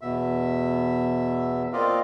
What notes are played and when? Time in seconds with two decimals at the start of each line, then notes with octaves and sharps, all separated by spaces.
0.01 E2 B2 E5
1.73 A#3 C4 F4 D5 D#5 F5